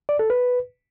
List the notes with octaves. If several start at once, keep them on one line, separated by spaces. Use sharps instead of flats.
D5
A4
B4